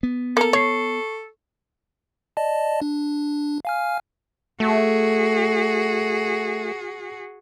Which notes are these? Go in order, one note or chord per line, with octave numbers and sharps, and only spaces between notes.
B3
A#3 A4 A#4
C#5 C#6 C7
D5 D#5 A5
D4
F5 G#5 F6
A3 F#4 G#4